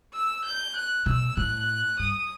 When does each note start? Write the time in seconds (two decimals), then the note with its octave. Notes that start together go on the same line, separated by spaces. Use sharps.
0.14 E6
0.44 G6
0.76 F#6
1.06 B2 E6
1.37 A2 F#6
1.99 G2 D#6